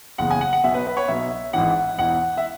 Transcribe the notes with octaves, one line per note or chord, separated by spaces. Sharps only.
F#1 E2 C#3 F#5
G#5
F#5
F#5
B1 B2 E5
B4
B4
C#5
B1 B2 E5
G#1 G#2 E3 F#5
E1 E2 E3 F#5
E5